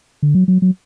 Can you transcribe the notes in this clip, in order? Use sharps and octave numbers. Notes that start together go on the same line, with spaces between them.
D3
F#3
F#3
F#3